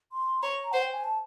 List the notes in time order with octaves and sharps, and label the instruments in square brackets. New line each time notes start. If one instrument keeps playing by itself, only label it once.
[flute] C6
[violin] C#5 [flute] A#5
[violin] C5 [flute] F#5
[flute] G5
G#5
A5